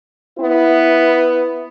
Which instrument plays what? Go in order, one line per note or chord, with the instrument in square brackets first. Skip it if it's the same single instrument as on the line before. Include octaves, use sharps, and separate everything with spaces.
[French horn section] B3 E4 B4